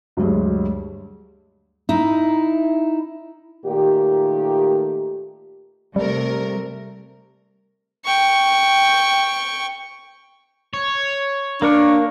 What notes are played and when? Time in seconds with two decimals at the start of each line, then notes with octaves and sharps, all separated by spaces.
0.17 D2 G2 F#3 G#3
1.89 D#4 E4
3.66 A#2 D#3 A3 G4
5.96 C3 G3 A3 A#4
8.06 G5 C#6
10.74 C#5
11.62 A#3 D4 A#4 C#6